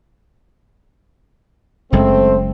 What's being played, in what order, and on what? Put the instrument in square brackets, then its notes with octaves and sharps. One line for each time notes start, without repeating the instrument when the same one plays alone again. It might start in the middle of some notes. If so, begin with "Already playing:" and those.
[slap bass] F#1 F#2 G#3 [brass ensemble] A3 C4